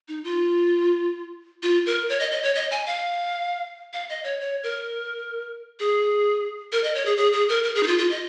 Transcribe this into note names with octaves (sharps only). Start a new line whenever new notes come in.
D#4
F4
F4
A#4
C#5
D#5
D#5
C#5
D#5
G#5
F5
F5
D#5
C#5
C#5
A#4
G#4
A#4
D#5
C#5
G#4
G#4
G#4
A#4
A#4
G#4
D#4
F4
F4
D#5